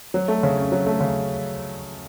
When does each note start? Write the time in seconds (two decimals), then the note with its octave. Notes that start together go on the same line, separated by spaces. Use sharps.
0.14 F#3
0.28 A3
0.43 C#3
0.58 C#4
0.72 F#3
0.86 A3
1.00 C#3